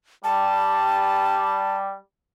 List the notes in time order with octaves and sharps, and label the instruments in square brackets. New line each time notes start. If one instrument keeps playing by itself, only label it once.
[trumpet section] G3 [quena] A5